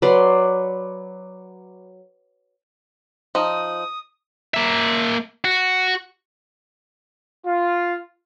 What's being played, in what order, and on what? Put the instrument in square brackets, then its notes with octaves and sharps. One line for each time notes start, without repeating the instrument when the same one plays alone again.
[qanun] F#3 B4 D5 C6
[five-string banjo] F3 D#4 [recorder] D#6
[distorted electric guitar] A#3 E5
F#4
[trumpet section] F4